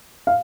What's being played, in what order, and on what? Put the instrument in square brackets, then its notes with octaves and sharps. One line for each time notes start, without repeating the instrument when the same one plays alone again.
[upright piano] F5